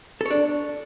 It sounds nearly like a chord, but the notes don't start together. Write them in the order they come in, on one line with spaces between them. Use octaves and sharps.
A4 C#5 D4